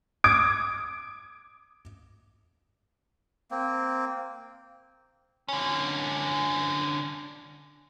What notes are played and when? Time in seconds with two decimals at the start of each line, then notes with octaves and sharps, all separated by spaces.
0.24 D6 D#6 G#6 D7
3.51 A#3 C4
5.48 D3 C#4